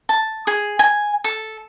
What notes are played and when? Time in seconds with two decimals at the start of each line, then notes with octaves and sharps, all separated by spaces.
0.09 A5
0.47 G#4
0.79 G#5
1.24 A4